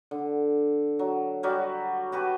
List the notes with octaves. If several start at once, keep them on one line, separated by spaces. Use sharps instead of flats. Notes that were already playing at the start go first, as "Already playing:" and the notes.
D3
F#3
F#3 G3 F#4
F#4 G4 B4 A5